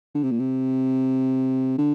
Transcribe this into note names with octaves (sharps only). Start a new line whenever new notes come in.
D3
C3
A#2
C3
D3